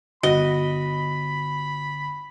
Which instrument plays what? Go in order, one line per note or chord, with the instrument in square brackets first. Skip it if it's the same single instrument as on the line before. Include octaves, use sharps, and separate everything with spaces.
[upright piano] G1 [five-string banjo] F#4 [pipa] D#5 [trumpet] B5